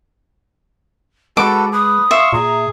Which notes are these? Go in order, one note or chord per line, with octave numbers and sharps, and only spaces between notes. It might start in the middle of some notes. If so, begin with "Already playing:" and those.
G#3 F#4 A4 B4 A5 D6
B4 D#6
E5 F5 C6 C#6
A#2 G#4 A#5